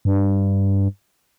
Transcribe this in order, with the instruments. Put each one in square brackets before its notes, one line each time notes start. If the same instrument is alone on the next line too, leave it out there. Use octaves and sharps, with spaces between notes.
[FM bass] G2